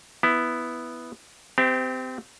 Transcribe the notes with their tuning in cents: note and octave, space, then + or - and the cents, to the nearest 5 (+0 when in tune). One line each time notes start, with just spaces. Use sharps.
B3 +0 E4 +0
C4 -30 G4 +0 E5 +35